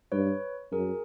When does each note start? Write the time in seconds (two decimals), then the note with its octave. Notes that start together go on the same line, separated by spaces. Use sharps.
0.12 G2 B4 C#5
0.72 F#2 G#4 A#4